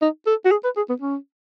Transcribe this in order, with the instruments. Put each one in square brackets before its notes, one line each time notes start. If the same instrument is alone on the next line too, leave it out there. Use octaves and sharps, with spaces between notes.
[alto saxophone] D#4
A4
F#4
G#4
B4
G#4
B3
C#4